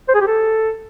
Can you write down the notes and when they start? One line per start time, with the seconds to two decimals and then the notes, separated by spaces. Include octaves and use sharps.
0.08 C5
0.14 G#4
0.21 G4
0.27 A4